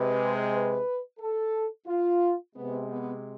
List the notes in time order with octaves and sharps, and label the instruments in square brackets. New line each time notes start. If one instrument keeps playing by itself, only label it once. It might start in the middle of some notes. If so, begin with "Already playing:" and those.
Already playing: [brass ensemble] C3 G#3 B4
B4
A4
F4
C3 G#3 B3
B3